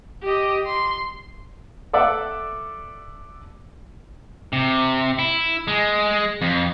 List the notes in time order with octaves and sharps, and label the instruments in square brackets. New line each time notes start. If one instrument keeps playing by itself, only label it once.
[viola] G4 D#5
C6
[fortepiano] A4 D5 E5 F#5
[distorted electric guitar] C3
E4
G#3
F2